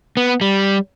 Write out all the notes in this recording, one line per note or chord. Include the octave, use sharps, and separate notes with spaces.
B3
G3